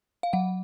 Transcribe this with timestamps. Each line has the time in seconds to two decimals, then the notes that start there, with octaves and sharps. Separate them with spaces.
0.23 F5
0.33 F#3 F#5